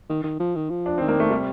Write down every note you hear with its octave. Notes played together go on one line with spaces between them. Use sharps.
D#3
D#3
F3
D#3
F3
D4
D#3 C4
A#3
A3
C3 G3